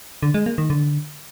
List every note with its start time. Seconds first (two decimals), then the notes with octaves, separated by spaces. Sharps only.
0.23 D3
0.34 G#3
0.46 A#3
0.58 D#3
0.70 D3